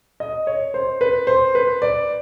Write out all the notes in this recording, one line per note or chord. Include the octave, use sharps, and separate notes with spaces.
D#5
C#5
C5
B4
C5
B4
D5